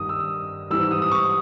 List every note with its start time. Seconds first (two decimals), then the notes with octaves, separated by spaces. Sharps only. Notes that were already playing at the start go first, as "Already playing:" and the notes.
Already playing: G2 D#3 G3 D#6
0.09 E6
0.70 G#2 E3 G3 E6
0.91 D#6
1.02 D#6
1.12 C#6